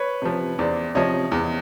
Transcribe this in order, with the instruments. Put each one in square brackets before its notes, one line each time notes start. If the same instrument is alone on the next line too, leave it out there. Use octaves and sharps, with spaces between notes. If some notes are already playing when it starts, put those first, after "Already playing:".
Already playing: [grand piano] B4 C#5
[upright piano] C3 F3
[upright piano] E2 [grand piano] C5 D5
[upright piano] C3 F3 [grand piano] C#5 D#5
[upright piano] E2